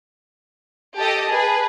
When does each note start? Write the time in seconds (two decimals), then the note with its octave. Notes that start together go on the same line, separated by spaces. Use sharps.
0.97 G4 A4 D#5 A5
1.31 G#4 B4